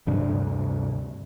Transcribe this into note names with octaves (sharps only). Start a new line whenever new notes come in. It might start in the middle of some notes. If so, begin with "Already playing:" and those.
D2 G2 C3 D4